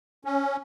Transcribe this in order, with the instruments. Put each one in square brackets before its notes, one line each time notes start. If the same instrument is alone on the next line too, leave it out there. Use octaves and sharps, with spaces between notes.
[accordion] C#4